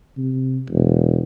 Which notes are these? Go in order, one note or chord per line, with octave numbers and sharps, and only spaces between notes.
C3
E1